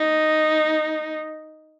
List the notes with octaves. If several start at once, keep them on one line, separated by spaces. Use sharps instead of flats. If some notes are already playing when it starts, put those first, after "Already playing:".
Already playing: D#4